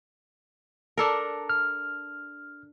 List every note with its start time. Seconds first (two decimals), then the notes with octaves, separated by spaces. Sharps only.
0.97 D4 A4 A#4
1.49 F6